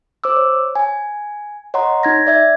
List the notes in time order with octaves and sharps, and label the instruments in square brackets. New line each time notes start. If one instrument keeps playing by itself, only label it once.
[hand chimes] C5 D6 E6
C#5
G#5
C#5 D#5 F#5 A#5 C6
D#4 G#6 A#6
D5 E5 G#6